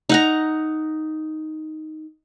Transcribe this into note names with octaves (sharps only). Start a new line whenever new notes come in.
D#4 F#5 A#5